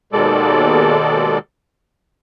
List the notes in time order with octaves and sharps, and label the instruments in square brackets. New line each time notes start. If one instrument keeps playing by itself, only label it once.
[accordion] D#2 B2 D#3 G#3 A4 D5